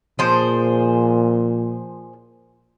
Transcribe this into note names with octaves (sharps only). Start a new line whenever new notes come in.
A#2 F3 G#4 C5